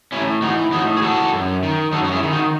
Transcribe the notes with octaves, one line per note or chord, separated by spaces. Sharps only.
A2 C#4 E4
E3 D#4 F#4
A2 D#4 F#4
G#4
E3 F#4 A4
F#2
D#3
F#2 F#4 A4
F#4
E4 G#4
D#3
D#4 F#4